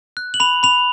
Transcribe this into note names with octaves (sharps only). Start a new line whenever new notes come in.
F#6
F#7
B5 F7
B5 F7